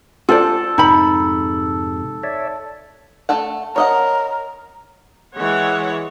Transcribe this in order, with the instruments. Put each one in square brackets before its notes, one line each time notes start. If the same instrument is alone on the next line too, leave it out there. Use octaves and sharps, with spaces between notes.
[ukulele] F4 C5 D5 [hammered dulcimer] A4
[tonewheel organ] F2 G#2 C3 [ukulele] D#4 B5
[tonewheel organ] C#5 D5 E5
[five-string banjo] A3 A4 F#5
[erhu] A#4 [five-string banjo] C#5 D#5 F#5
[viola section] E3 G#3 C#5 F#5